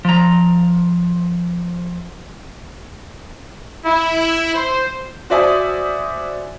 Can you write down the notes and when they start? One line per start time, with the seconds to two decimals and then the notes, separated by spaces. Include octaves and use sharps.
0.05 F3 A#5
3.85 E4
4.55 C5
5.30 F#4 C5 D5 E5 G#5 D#6